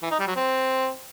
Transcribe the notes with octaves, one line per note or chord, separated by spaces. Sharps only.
E3
D#4
G3
F#3
C4